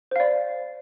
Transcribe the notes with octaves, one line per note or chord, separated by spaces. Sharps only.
C5 D5 F5